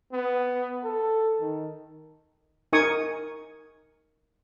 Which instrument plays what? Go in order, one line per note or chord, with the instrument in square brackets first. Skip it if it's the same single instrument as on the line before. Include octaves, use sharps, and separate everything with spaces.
[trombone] B3
A4
D#3
[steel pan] D#4 A#4 G#5 C#6 D#6